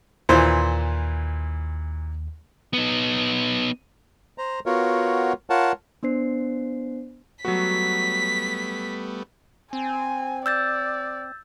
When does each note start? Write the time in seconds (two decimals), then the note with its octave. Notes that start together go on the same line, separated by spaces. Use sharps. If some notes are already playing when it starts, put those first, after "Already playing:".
0.29 D#2 A#2 E3 C5
2.73 B3 D#4
4.38 C5 A#5
4.66 B3 F4 F#4 A#4 C#5
5.50 F4 A#4 C#5 F#5 A5
6.03 B3 D4 C5 C7
7.45 F#3 G3 A3 B3 F#4 B6
9.73 C4 G#5
10.46 D5 E6 G6 A6